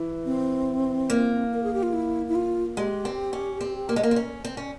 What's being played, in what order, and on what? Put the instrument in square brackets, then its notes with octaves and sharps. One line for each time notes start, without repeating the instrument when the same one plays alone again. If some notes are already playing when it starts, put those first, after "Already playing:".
Already playing: [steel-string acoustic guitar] E3
[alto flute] C4
[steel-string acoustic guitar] A#3
[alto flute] A#4
G#4
G4
F4
E4
E4
F4
[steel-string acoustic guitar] G#3 [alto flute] G4
[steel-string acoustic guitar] C4
C#4
C4
A#3
G#3
A#3
C4
C#4
C4
C#4